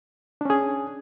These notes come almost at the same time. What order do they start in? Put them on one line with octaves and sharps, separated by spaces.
D4 C#4 G#4